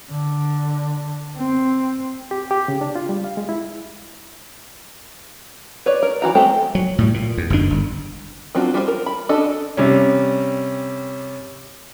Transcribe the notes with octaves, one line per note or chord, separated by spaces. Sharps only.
D3
C4
G4
G4
C#3
D4
F4
G3
F5
G#3
E4
B4 C#5 D5
A#4
E3 F#4 A#5
G#3 A3 C4 G4 A4
F#3
A2 G3
A#2
E2
F#1 F#2 D#3 D4
G1
F#3 C4 D4 F4 F#4
G3 F4 A4 C5
A#4
B5
C#4 D4 F#4 A4 D#5
C3 G3 C#4